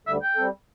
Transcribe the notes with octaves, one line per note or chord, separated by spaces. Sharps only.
D2 D3 G3 E5
G5
G3 C4 A4